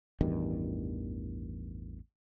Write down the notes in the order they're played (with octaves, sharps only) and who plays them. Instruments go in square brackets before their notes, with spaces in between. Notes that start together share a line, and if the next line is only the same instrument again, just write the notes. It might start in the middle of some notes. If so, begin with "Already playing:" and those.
[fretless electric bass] A1 E2 G2 D#3